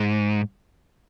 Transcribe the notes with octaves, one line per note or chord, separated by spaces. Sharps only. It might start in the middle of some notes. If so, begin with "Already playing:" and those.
Already playing: G#2